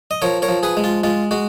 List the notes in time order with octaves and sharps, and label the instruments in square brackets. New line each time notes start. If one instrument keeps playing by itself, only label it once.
[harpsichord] D#5
F3 A#4 C#5
A#4 C#5
F3
G#4 B4
G#3
F4
G#3 F4
G#3 F#4